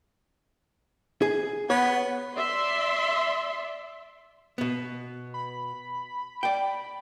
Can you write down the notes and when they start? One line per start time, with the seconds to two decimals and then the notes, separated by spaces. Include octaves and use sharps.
1.22 G#4
1.70 B3 C#5
2.35 D5 E5 C6
4.58 B2 B3
5.34 B5
6.43 D5 G5